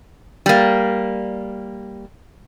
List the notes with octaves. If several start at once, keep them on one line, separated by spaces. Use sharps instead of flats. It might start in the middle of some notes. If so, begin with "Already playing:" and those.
G3 A#3